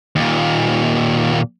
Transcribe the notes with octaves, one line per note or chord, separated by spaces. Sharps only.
D#2 A#2